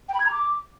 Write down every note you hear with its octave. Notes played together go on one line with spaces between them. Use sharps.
G5
B5
G#6
A#5
D6